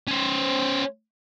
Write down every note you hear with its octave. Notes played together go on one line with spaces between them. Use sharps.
C#4 C5